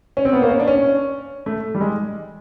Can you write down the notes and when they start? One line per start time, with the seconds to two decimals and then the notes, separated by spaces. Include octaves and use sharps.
0.17 C#4
0.25 C4
0.33 B3
0.42 A#3
0.50 C#4
0.60 D4
0.67 C#4
1.46 A3
1.75 G3
1.81 G#3